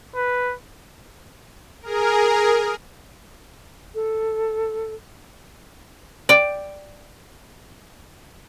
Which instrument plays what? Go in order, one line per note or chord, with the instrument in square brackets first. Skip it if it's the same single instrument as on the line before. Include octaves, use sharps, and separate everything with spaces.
[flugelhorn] B4
[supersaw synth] G#4 A#4
[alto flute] A4
[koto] D5 G5